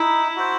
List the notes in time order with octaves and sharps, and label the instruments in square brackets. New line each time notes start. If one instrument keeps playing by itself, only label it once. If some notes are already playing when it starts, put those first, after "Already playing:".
Already playing: [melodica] D#4 [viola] E4
[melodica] F#4 C5